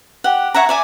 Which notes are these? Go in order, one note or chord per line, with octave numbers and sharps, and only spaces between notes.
G4 F#5
C#5 E5 F#5 A#5
D5 E5 G#5